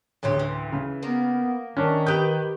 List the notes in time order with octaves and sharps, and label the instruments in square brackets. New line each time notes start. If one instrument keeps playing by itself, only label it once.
[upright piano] A1 D2 [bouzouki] C#3 F#3 G4
[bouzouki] E3
[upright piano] C#3
[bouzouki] A#3 [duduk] B3
[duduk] D#3 [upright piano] C#4 D4
[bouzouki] G4 G5 [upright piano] B4 D#6 G6